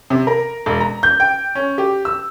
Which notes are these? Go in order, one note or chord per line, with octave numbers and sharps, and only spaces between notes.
C3
A#4
E1
A#5
G6
G5
C#4
G4
E6